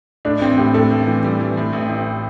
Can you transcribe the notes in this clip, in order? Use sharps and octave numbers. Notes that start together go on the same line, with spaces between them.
A2 D4
A1 C4
A2 G4
A2 A4
A1
E3
G3
E3
A2
A1
A1